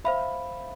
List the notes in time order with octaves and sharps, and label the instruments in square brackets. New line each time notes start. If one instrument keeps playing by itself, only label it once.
[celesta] C5 F5 B5 [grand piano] E5